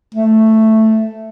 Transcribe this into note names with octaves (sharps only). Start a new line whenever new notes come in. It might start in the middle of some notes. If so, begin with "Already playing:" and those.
A3